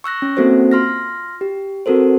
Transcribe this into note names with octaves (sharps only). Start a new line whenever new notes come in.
C#6 E6 F#6 A#6
C#4
A#3 C4 F#4 A4 C5
F4 C6 F6 A#6
G4
C4 F#4 A4 A#4 C5